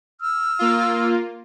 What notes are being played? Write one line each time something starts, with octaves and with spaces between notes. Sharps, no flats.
E6 F6
A#3 F4